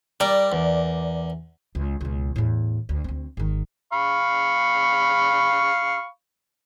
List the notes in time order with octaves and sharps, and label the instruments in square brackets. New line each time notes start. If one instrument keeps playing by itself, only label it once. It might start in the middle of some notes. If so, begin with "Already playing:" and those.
[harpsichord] G3 [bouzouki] A#4 D5
[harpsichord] E2
[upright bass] C#2
C#2 B2
E2 A2
D2
D2 C4
G#1 D#3
[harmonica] F5 B5 C#6